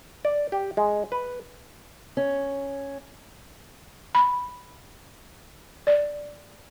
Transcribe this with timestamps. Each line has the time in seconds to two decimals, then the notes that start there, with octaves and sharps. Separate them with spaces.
0.25 D5
0.52 G4
0.77 G#3
1.12 B4
2.17 C#4
4.15 B5
5.87 D5